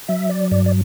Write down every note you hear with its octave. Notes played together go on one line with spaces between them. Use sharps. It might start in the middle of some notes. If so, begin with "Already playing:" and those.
F#3 E5
D5
G2 D5
D5